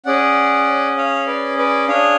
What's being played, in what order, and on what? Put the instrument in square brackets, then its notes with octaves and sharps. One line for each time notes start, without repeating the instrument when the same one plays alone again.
[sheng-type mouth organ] C#4 G#4 D5 F#5
C#5 F5
B4 D5
B4 D5
D4 G#4 C#5 F5